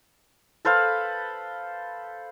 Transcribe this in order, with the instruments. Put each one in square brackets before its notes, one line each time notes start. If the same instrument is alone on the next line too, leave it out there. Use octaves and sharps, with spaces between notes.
[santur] A4 B4 C5 F5